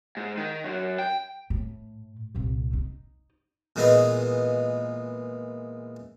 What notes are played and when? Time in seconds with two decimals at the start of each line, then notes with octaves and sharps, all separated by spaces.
0.17 G#2
0.38 D#3
0.64 F#2
0.99 G5
1.50 A2
2.35 C2 A#2
2.73 D#4
3.76 A#2 E3 G#3 B3 D#5